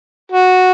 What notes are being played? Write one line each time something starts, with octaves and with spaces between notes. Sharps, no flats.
F#4